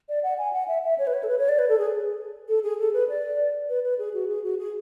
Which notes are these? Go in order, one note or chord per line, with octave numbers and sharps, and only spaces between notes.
D5
F#5
G#5
F#5
E5
E5
C#5
B4
C#5
A4
B4
C#5
D5
B4
A4
G#4
A4
G#4
A4
B4
D5
B4
B4
G#4
F#4
G#4
F#4
G#4